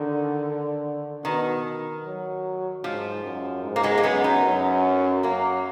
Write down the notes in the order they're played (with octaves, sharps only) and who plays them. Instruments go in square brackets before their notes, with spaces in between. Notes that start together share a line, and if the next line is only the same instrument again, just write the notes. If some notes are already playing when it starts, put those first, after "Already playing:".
Already playing: [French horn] D3 [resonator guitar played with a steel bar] D#3
[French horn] B2 [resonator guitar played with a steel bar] D#3
[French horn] F#3
[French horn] G#2 [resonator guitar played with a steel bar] F3
[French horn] F#2
G#2
[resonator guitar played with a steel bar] A#3
G#3 B3
A#3
[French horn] F#2 [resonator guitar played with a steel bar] G#3 B3
[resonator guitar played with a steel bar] B3 D#4
[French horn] F#2
[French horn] F#2 [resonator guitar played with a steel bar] F#3 A#3